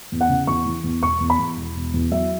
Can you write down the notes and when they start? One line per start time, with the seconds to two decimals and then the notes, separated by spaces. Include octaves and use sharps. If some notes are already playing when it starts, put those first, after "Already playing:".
0.12 E2
0.21 F#5
0.29 C#3
0.47 E2 C#6
0.66 E3
0.84 E2
1.03 E1 C#6
1.20 E2
1.30 B5
1.39 E2
1.57 E1
1.76 E1
1.94 E2
2.11 F#3 E5